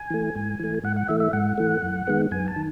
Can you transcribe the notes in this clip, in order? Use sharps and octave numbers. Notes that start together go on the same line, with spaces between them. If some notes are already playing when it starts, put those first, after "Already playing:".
Already playing: G#5
E3 A3
G#2
E3 A3
G#2 F#5
F#5
E3 A3 E5
E5
G#2 F#5
E3 A3
F#2
D#3 G#3 B3
F#2 G#5
A5
D#3